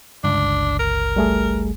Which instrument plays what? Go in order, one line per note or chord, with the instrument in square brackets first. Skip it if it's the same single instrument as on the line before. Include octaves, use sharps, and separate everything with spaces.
[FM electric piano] G1 C#2 [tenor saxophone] D4
[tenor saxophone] A#4
[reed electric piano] G3 A3 G#4